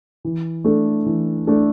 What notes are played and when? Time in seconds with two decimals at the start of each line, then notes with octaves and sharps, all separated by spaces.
0.25 E3
0.64 A3 D4 A4
1.06 E3
1.47 A3 D4 A4